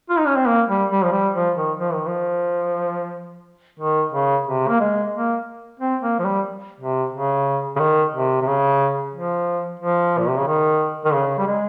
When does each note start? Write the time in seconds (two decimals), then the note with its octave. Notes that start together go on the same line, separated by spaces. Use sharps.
0.10 F4
0.19 D#4
0.27 C#4
0.36 C4
0.46 A#3
0.68 G3
0.90 G3
1.04 F3
1.13 G3
1.35 F3
1.56 D#3
1.79 F3
1.93 D#3
2.07 F3
3.80 D#3
4.12 C#3
4.47 C3
4.68 A#3
4.80 G#3
5.14 A#3
5.80 C4
6.01 A#3
6.19 F3
6.25 G3
6.81 C3
7.13 C#3
7.76 C#3
7.80 D#3
8.14 C3
8.42 C3
8.47 C#3
9.14 F3
9.80 F3
10.18 A#2
10.28 C3
10.38 C#3
10.47 D#3
11.05 D#3
11.13 C#3
11.38 G3
11.47 G#3